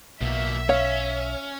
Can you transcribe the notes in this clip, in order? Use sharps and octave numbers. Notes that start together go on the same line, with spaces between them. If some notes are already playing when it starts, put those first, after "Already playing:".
B1 B2 A#3 E5
C#4 C#5 F5